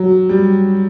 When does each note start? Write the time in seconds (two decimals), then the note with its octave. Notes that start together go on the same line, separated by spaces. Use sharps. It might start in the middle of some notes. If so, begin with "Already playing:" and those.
Already playing: F#3
0.29 G3